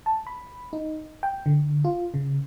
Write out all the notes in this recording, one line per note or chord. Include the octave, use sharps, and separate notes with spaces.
A5
B5
D#4
G5
D3
F4
C#3